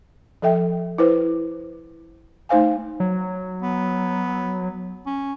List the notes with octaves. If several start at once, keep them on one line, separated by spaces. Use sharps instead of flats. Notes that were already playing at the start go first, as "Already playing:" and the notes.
F3 A4 E5 G5
E4 B4 C5
A3 D#4 C5 F5 G#5
F#3
B3
C#4